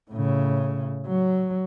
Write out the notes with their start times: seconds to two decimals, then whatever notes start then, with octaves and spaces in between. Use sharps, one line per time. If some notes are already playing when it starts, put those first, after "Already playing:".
0.11 A2 C#3
1.07 F#3